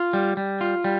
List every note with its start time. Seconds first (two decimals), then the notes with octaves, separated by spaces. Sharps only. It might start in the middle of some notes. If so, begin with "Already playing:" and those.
Already playing: F4
0.13 G3
0.37 G3
0.61 F4
0.84 G3